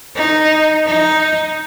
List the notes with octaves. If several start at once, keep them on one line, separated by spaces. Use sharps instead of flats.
D#4
D#4